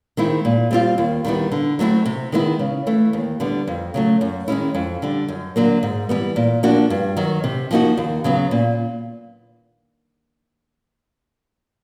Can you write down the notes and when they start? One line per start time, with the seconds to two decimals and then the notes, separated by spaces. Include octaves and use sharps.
0.17 D#3 G#3 C4 E4
0.45 A#2
0.71 G3 C4 F4
0.98 D#2
1.25 D#3 G3 B3 E4
1.52 D3
1.79 F#3 A3 C4 E4
2.06 C3
2.32 D#3 G#3 B3 E4
2.59 C#3
2.87 E3 A3
3.13 D#2
3.40 D3 G3 B3
3.67 F2
3.94 C#3 F#3 A3
4.21 F#2
4.48 D#3 G#3 C#4 E4
4.75 F2
5.02 D3 G3
5.28 F#2
5.56 D3 F#3 A#3
5.83 G#2
6.09 E3 G3 B3
6.36 A#2
6.63 F3 A#3 D4 F#4
6.90 G2
7.17 D#3 F#3
7.44 C3
7.71 F3 A#3 D#4 F#4
7.97 D#2
8.24 C#3 F#3 B3
8.51 A#2